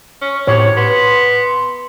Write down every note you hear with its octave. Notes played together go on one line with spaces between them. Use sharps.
C#4
A2 C3 C#5
B3 C6